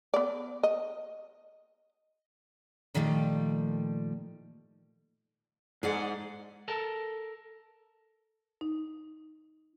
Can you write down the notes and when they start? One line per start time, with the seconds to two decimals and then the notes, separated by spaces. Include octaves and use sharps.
0.14 B3 D5
0.63 D#5
2.94 A#2 D#3 F3 G3 A3
5.83 G#2 G#4 D5 F#5
6.68 A4 A#4 A5
8.61 D#4